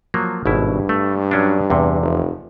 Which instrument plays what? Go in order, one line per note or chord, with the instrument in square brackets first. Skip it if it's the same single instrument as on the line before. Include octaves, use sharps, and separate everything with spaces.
[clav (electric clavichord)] F3 F#3 A#3
[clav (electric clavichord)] G#1 B2 E4 [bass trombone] G2
[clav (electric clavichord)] A3
F#3 C#4 D4
E2 C3
[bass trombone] F1